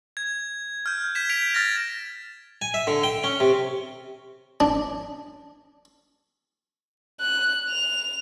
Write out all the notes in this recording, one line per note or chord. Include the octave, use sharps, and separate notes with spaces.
G#6
F6 G6
G6 G#6 B6 E7
G6 B6 D7 F7
F6 A6 A#6
G#5
E5
D3
G5
C#4
C3
D4
F#6
F7